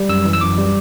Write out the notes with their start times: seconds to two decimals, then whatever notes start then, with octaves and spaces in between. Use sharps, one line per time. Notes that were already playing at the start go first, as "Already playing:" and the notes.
Already playing: G3
0.09 F#2 E6
0.25 E3
0.33 E6
0.41 F#2 D6
0.58 G3